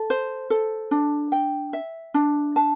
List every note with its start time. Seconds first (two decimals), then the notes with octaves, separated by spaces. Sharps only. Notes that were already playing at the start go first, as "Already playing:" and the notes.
Already playing: A4
0.10 C5
0.50 A4
0.91 D4
1.32 G5
1.73 E5
2.14 D4
2.56 A5